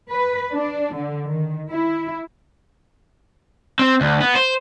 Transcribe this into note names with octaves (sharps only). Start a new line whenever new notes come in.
B4
D4
D3
D#3
E4
C4
D2
B3
C5